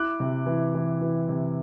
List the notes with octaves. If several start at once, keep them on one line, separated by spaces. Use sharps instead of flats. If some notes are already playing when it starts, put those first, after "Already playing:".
Already playing: E4 D6 F#6
C3
E3
E3
E3
C3